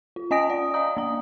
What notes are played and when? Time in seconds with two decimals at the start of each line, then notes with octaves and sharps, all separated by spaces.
0.16 F4
0.31 C#4 D#5 G#5 D#6 A#6 D7
0.50 D5
0.74 D#5 F5 A#5 D#6
0.97 A#3 A#5